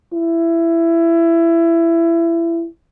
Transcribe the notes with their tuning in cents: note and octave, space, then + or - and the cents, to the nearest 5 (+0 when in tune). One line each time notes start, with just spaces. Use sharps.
E4 +20